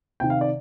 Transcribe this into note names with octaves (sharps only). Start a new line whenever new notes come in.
C3 D#3 G5
F5
D5